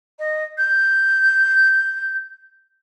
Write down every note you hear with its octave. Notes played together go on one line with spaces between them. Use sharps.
D#5
G6